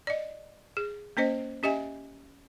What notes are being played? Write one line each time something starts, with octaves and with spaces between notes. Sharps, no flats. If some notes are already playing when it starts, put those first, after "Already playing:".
D5 D#5
G#4
A#3 C#4 C5 D#5
C#4 G4 D#5 E5 G#5